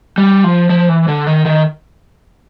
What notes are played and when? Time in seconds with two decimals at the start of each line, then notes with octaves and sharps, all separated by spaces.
0.18 G3
0.44 F3
0.70 F3
0.89 E3
1.08 D3
1.27 D#3
1.45 D#3